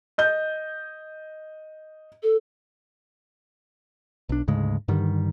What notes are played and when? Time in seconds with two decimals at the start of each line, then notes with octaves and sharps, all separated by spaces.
0.18 D#5 G6
2.23 A4
4.29 B1 D4
4.48 D2 G#2 C#3 G#3
4.88 G2 D3 D#3 G3